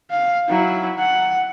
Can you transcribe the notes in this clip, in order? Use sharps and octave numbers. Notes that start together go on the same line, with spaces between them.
F5
F#3 E4
F#5